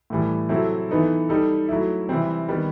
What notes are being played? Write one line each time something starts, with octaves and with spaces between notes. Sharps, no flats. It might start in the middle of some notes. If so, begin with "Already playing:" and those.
A2 E3 G3
C3 F#3 C4 E4 A4
E3 B3 D#4 A4
G3 D#4 A4
F#3 A3 E4
C3 E3 G3 C4
D#3 G3 B3